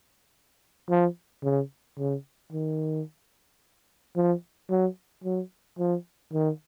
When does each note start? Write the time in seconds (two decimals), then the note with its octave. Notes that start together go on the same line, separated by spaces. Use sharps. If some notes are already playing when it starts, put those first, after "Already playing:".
0.90 F3
1.44 C#3
1.98 C#3
2.52 D#3
4.16 F3
4.70 F#3
5.24 F#3
5.78 F3
6.33 D#3